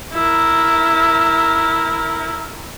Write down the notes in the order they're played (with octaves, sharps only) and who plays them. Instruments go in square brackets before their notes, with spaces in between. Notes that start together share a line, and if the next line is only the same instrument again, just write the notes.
[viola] E4 A#4